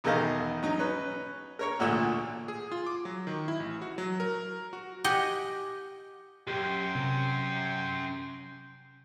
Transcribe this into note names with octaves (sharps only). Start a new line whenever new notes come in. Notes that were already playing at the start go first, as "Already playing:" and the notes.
B1 E2 D#3 A4 D#5 F5
F#3 D#4
C#4 B4
A#4 C#5 C#6
A1 D2 A#2 D3 E6
G#4
F4
D6
F#3
D#3
E4
A1
F#4
F#3
A#4
F#4
G4 D#5 F#5 G#5
B1 F#2 G4 G5 C6
C3